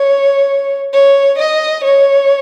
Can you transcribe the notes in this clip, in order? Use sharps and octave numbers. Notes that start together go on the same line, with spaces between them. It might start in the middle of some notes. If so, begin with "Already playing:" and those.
Already playing: C#5
C#5
D#5
C#5